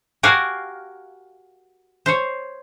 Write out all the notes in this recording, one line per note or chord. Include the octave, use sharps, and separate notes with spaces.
F#4 G4 A#4 F5 G#5
C5 C#5